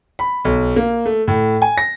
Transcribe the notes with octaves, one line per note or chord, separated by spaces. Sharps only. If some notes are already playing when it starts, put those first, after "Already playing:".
B5
B1
A#3
A3
A2
G#5
A#6